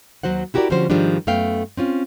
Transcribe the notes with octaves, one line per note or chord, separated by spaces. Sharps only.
D#2 D#3 F#3 F#4 C5 F#5
E4 F#4 G4 A4 A#4 D5
D3 F3 G3 C#4 F#4 C5
G#2 D#3 F3 G3 G#3 D4
F#2 A3 B3 F5 G5
C4 C#4 F4